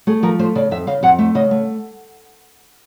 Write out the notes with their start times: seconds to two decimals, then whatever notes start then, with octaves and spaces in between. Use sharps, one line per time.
0.07 A3 G#4
0.23 F3 A#4
0.39 A3 C5
0.55 C#3 D5
0.71 F2 E5
0.87 C#3 F5
1.03 F2 F#5
1.19 A3 E5
1.35 C#3 D#5
1.51 A3